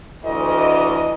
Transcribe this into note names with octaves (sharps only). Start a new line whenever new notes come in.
D2 E3 D#5